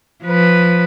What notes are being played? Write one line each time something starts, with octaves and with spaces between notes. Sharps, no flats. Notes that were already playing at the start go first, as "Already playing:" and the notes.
F3 B4